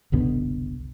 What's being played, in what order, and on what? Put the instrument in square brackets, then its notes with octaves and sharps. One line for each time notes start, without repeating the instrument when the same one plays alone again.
[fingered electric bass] F#1 C2 B2 D3